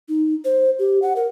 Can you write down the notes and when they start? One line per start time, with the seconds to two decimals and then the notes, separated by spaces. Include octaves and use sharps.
0.09 D#4
0.45 C5
0.79 G4
1.02 F#5
1.16 A#4